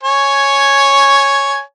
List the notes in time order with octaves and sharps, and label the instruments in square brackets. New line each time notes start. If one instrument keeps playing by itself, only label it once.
[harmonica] C#5 G#5